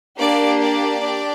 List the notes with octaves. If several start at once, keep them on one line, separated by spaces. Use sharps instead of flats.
A#3 D4 G4 D5
D5
D4 G4